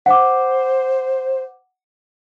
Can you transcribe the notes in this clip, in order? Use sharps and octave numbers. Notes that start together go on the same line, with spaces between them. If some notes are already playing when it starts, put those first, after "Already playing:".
C5 F#5 D6